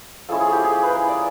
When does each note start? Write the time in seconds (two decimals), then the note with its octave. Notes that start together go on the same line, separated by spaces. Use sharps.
0.29 F3 G#3 C#4 E4 A4
0.41 G#4
0.52 G4
0.64 G#4
0.82 B4
0.92 A#4
1.08 D5